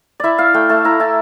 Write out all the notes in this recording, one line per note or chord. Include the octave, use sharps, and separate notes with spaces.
E4 D5 E5
E4 F5
A3 G5
A3 A5
E4 A#5
E4 A5